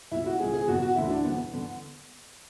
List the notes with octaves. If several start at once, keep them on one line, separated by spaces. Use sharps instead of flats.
C#2 B2 E4
F#4
C#2 B2 G#4
G#4
F#1 E2 B2 F#4
F#4
E1 D2 D3 E4
D4
E1 E2 B2 B3
E2 D3